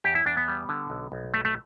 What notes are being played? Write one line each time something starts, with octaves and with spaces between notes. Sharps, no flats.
E2 G4
E4
E2 D4
B3
G3
D3
B1
B1
A3
A3